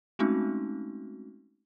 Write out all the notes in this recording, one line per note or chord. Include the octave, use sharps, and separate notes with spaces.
G#3 A3 C4 C#4 D#4 F#4